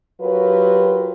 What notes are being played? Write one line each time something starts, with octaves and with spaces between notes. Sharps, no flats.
F#3 F4 G4 A#4 B4 C#5